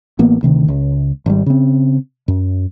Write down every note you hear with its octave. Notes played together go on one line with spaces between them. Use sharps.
A1 A#3 B3
D2 C3 D#3
C#2
G#1 G3
C#3 C4
F#2